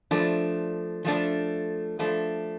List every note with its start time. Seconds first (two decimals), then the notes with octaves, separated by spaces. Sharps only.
0.11 F3 A3 D4
1.05 F3 A3 D4
1.99 F3 A3 D4